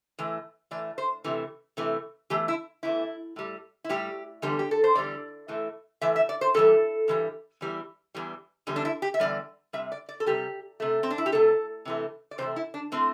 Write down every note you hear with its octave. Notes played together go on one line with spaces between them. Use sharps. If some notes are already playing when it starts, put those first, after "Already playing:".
A2 E3 A3
A2 E3 A3 D5
C5
C3 E3 A3
C3 E3 A3
E2 E3 A3 G4
E4
E2 E3 A3 E4
A2 G3
E4
A2 G3 G4
E2 D3 G3
G4
A4
C5
E2 D3 G3 D5
A2 E3 A3
A2 E3 A3 E5
E5
D5
C5
G2 E3 G3 A4
G2 E3 G3
E2 E3 G3
E2 E3 G3
E2 D3 G3
D4
E4
G4
E5
E2 D3 G3 D5
C3 G3 E5
D5
D5
A4
C3 G3 G4
C3 A3
C4
D4
E4
G4
C3 A3 A4
C3 E3 A3
D5
C3 E3 A3 C5
E4
D4
A2 A3 C4